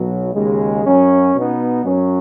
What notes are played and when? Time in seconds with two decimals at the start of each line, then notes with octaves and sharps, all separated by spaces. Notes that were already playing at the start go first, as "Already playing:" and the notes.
Already playing: B1 B2 F#3
0.33 D#2 C#3 G#3
0.84 F#2 F#3 C#4
1.35 B2 B3 D#4
1.85 F#2 F#3 C#4